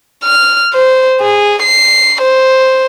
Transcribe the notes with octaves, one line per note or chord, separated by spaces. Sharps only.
F6
C5
G#4
C7
C5